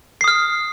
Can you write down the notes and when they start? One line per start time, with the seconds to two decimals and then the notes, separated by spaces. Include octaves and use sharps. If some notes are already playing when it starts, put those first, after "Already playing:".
0.21 C7
0.24 D#6
0.28 F6